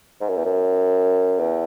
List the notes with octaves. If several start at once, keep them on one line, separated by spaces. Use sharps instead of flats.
G#2
F#2
E2
F#2
E2